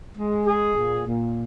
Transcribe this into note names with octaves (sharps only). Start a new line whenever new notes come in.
G#3
G#4
A#2
A#2